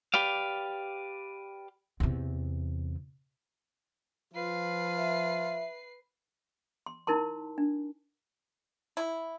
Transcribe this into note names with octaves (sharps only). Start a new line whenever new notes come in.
G4 B4 D5 F5
E2 C3
F3 F4 B4 C7
E5
C6
D#4 E4 A#4 A5 C6
D4
E4